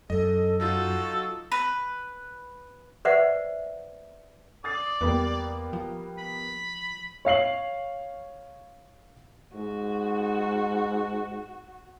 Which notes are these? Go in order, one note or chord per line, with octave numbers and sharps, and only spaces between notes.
F#2 A4 D#5
F#3 D#4 F4 F#4 A4
B4
B4 C5 D5 E5 F#5
D5 D#6 A6 C7
E2 G3 A#3 B3
F3
B5
C#5 F5 C7 F#7
G#2 F#4